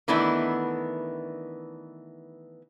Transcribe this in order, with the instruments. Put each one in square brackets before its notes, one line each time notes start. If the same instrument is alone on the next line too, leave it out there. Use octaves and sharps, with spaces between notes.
[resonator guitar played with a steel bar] D#3 E3 A3 B3 D4 E4